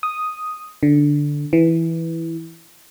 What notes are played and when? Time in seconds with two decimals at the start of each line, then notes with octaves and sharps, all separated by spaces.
0.03 D#6
0.83 D3
1.53 E3